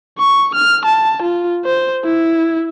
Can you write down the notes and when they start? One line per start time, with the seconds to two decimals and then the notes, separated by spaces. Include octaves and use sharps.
0.19 C#6
0.55 F6
0.85 A5
1.22 F4
1.65 C5
2.04 E4